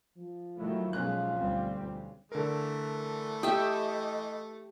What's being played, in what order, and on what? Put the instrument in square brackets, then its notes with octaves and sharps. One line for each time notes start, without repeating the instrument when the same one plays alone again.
[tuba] F3
[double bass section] D#3 F#3 A3 [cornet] E4
[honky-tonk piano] B1 C#4 F#6 [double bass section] G#3 [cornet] F4
[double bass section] D2 G3 C4
[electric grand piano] D3 A#4 [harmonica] E3 A3
[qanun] G4 E5 [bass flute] D#5 [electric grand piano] D#6